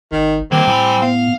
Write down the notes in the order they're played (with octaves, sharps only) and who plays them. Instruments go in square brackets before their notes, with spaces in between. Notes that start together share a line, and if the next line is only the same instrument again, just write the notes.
[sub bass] G#1 [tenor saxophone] D#3
[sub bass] D#3 [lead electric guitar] G3 A#3 [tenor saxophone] C4
[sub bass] A2 [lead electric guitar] G3 B5 [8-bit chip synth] G#5 C6 E6
[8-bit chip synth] B3 [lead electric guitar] F5